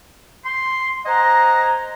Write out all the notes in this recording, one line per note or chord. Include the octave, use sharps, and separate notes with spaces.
C6
C5 D#5 F#5 G#5 A#5